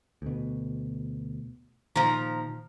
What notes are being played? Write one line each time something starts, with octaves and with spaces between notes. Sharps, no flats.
D2 B2
A#2 D#3 F3 A#5